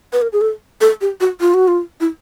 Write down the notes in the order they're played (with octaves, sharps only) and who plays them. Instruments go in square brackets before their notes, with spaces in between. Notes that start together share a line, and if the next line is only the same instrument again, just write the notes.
[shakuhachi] B4
A#4
G#4
A4
A4
G4
F#4
F4
F#4
F4
E4